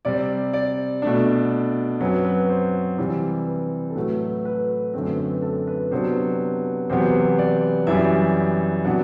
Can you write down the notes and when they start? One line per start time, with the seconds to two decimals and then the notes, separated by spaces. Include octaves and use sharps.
0.05 C3 G3 C4 D5
0.53 D5
1.02 B2 A3 D4
2.00 F#2 F#3 C4 B4
2.25 B4
2.50 C5
2.98 C3 E3 G3 C4
3.47 B4
3.90 A4
3.96 A2 F#3 A3 B4
4.28 B4
4.45 B4
4.94 F#2 D3 A3 C4 B4
5.18 B4
5.42 A4
5.67 B4
5.91 C3 F#3 B3 D4 C5
6.89 E2 C3 F#3 B3 C5
7.38 D5
7.87 F#2 E3 G3 E5
8.85 C3 F#3 B3 D4 F#5